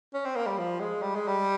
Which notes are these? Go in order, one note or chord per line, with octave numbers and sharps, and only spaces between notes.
C#4
C4
A#3
G3
F3
G#3
G3
G#3
G3